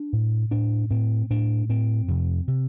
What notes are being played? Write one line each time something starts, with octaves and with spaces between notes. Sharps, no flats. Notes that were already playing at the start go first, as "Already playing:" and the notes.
Already playing: D4
A2
A2 D4
A2 C4
A2 D4
A2 C4
F2 C3
C3